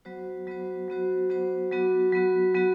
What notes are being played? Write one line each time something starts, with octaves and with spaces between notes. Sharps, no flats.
F#3 B3 F#4 C5
F#3 B3 F#4 C5
F#3 B3 F#4 C5
F#3 B3 F#4 C5
F#3 B3 F#4
F#3 B3 F#4
F#3 B3 F#4